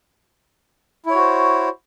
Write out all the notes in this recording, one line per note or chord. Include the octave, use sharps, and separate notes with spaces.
E4 F#4 C5 C#5